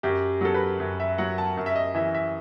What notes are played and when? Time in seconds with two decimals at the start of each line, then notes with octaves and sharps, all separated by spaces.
0.03 F#2 G4
0.41 F#3 A4
0.54 B4
0.80 F#2
1.00 E5
1.18 F#3 F#5
1.38 A5
1.57 F#2
1.66 E5
1.76 D#5
1.95 E3 E5
2.15 E5